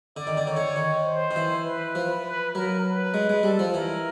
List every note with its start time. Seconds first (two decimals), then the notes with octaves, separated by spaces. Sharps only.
0.17 D3 D5
0.27 D#3
0.37 D3
0.46 D#3 C#5
0.56 D3
0.76 D#3
1.05 C5
1.31 D#3
1.36 E3
1.65 B4
1.95 F3
2.25 B4
2.55 F#3 A#4
2.84 B4
3.14 G#3
3.29 G#3
3.43 G3 A4
3.59 F3
3.73 E3 A#4